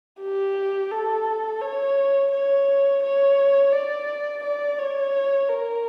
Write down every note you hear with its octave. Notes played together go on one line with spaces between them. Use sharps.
G4
A4
C#5
C#5
C#5
D5
D5
C#5
A#4